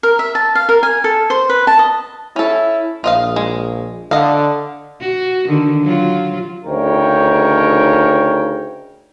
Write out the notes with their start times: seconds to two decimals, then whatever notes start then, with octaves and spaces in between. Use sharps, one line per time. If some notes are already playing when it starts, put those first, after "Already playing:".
0.03 A#4
0.19 E5
0.35 A5
0.55 F5
0.69 A#4
0.83 G#5
1.04 A4
1.30 C5
1.49 B4
1.67 A5
1.79 D#5
2.36 C#4 E4 A4
3.04 A#1 F4 D#5 F5
3.36 G#3
4.11 D3 D#5 F5
5.01 F#4
5.48 D3 D#3
5.83 F#3 F4
6.65 D2 C#3 D#4 A#4 C#5 G5